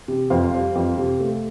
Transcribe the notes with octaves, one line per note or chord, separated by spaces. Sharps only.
C3
F2 C5 F5
G3
F2
C3
A3